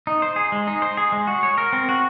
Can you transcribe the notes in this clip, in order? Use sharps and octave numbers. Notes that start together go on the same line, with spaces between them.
D#4
C5
G#4
G#3
D#4
C5
G#4
G#3
F#4
C#5
A#4
C4
F#4